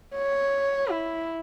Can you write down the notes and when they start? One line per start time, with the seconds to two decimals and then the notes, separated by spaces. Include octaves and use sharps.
0.16 C#5
0.91 E4